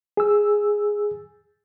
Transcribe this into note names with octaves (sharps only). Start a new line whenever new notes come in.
G#4 E6